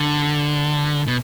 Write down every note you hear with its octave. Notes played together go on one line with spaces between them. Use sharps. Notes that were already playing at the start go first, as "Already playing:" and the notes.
Already playing: D3
B2